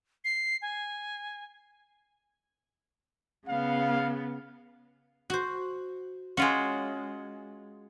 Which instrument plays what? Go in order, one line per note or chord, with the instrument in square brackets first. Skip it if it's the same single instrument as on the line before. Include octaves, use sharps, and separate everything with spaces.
[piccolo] C7
G#5
[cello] C#3 B3 [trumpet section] F5
[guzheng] F#4 C5
[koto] G#3 F4 F#4 [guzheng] C#4 F5